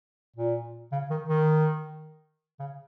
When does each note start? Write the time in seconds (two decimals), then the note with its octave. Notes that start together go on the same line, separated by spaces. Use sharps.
0.36 A#2
0.92 C#3
1.10 D#3
1.29 D#3
2.59 C#3